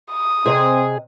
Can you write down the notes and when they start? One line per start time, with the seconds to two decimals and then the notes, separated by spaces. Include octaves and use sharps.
0.12 D#6
0.46 C3 C4 G#4 D#5